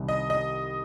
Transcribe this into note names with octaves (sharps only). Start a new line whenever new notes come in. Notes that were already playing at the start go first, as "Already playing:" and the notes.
Already playing: C2 C3 D#3 G3
D#5
D#5